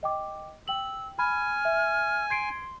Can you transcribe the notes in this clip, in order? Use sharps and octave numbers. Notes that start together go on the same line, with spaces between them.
D#5 G5 D6
G5 E6 F#7
G#5 B5 F6
E5
C6 G#6 C7 D7